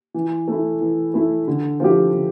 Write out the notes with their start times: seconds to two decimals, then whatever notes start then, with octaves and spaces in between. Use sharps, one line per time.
0.14 E3
0.48 A3 E4
0.81 E3
1.14 A3 E4
1.48 D3
1.80 F3 A3 E4 G4
2.14 D3